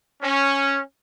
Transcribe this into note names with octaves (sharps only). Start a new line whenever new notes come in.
C#4